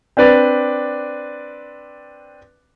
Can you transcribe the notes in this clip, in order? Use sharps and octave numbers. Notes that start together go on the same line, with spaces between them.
C4 D4 B4 D5